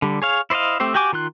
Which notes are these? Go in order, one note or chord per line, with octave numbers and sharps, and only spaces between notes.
D3 G3
G#4 C#5 F5
E4 C5 D5 D#5 F5
A3 C4 G4 C5
F#4 G4 G5 G#5 D6
D#3 F4 C6 F#6